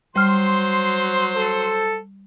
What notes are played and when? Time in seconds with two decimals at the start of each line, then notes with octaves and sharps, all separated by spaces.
0.16 F#3 G3 C5 C6 F6
1.35 A4